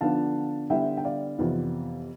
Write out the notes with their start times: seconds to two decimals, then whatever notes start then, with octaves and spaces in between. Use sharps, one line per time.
0.01 D3 F3 B3 D4 F5 A5
0.70 D3 G3 B3 E4 E5 G5
0.97 G5
1.04 D5 F5
1.38 F2 C3 E3 B3 F4